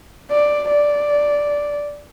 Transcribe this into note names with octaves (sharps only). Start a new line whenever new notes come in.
D5
D5